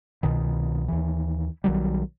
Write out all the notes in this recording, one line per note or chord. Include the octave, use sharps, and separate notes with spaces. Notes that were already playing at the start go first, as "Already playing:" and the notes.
C2 B2 D#3
D#2 E3
B1 D#3 F#3 G3